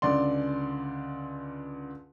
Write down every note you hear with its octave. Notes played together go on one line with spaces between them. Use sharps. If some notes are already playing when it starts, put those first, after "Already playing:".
C#2 D3 D5 C6